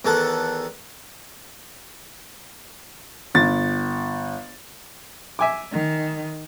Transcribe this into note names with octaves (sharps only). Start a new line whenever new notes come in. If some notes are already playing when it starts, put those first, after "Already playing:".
E2 D#3 A4 F#5
G1 A6
E5 G#5 D6
D#3